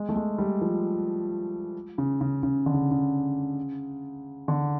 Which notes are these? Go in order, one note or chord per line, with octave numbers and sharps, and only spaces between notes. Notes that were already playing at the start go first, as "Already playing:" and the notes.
Already playing: G#3
A3
G#3
G3
F3
C#3
C#3
C#3
D3
C#3
C#3
D3